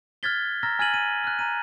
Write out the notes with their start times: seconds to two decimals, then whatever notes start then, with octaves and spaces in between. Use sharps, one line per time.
0.23 F6 F#6 G#6 A6 B6 G7
0.63 A#5 E6 F6 A6 A#6
0.79 G#5 F6 G#6 A6 D#7 F#7
0.94 D#7
1.24 F6 F#6
1.39 A#5 D#7